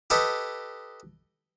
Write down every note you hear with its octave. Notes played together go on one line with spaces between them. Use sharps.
G4 A4 B4 D#5